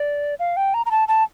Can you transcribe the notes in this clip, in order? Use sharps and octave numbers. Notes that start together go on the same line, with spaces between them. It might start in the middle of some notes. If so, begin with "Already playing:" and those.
Already playing: D5
F5
G5
A#5
A#5
A5
A5